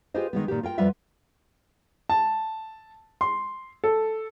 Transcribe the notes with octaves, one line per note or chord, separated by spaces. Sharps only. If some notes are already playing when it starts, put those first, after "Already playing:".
F4 G4 G#4 B4 C5 D#5
D#3 G#3 B3
A#2 D#3 G4
F4 A#4 G5
F2 G3 F4 B4 E5 F#5
A5
C6
A4